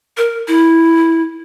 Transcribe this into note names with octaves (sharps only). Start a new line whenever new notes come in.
A#4
E4